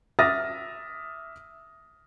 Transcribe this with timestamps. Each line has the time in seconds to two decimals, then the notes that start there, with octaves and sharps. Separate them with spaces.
0.19 E5 D6 D#6 F6 A6 A#6